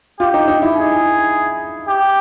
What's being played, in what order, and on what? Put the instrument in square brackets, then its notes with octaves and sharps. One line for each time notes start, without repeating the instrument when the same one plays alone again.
[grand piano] F4 [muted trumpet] G4
[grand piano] D#4
D#4
E4
[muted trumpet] G#4
G4